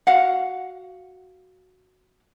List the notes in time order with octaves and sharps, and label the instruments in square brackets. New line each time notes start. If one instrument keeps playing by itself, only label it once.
[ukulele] F#4 F5 F#5